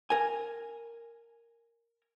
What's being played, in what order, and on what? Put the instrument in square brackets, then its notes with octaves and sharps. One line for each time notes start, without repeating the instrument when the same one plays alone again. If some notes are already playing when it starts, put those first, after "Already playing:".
[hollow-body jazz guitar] A#4 G#5